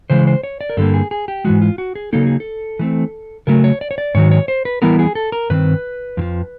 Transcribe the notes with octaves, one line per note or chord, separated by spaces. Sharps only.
C#3 E3 G#3 C5
C5
C#5
D5
A#4
G2 D3 G3 A#3 A4
G#4
G#4
G4
G#2 E3 G#3 F#4
F4
F#4
G#4
C#3 F#3 A#3 D#4 A4
G#4
A4
E3 A3 C4
C#3 F#3 A3 A#4
C#5
D5
C#5
D5
G#2 D#3 F#3 C#5
C#5
C5
B4
E3 G3 B3 E4 A#4
G#4
A4
A#4
G2 D#3 C4 B4
F2 D3 F3